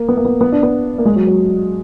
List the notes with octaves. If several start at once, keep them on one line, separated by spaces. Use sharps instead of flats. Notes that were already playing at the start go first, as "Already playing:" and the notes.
Already playing: A#3
B3
A#3
B3
B3
D4
B3
A#3
G#3
F#3
F#3